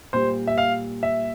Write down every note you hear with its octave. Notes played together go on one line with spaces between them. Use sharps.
A#2 G3 C5
E5
F5
E5